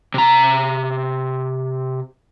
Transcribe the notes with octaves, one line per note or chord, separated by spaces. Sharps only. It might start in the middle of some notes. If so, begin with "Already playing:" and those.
C3 A#5